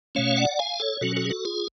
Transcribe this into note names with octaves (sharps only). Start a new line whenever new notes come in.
B2 A3 C#4 C#5 F5
D5 F#5
F5 G#5
A4 C#5
B2 F#3 C#4 F#4 A4
F#4 A4
G#4
F#4 A4
F4 G#4